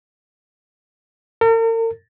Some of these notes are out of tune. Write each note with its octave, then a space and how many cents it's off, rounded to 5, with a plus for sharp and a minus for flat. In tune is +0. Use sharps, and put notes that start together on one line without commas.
A#4 -45